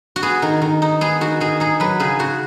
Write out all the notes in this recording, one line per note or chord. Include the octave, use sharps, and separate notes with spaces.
F#4
B3 G#4
D#3
D#3
D#4
B3 G#4
D#3 F#4
D#3 G#4
D#4 G#4
F#3 B4
C#3 G#4
C#3 F#4